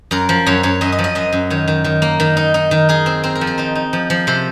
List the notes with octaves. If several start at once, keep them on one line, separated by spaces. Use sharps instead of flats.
F#2 A#4
F3
F#2 C#5
F#2 C#5
F#2 D#5
D#5
F3
D#5
F#2 D#5
F#2
D#3 C#5
D#3
D#3
A#3
D#3
D#4
D#4
D#3
D#4 G#4
C4
C4 A#4
A#4
F3
A#4
D#4 C5
D#4
F3
F3
C3 C5